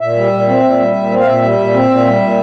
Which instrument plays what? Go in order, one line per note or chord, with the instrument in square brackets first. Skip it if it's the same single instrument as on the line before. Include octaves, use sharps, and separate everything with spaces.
[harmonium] A#2 E5
G3
A#2
C4
A#2
G3
A#2
C4
F5
A#2 E5
G3
A#2
C4
A#2
G3
A#2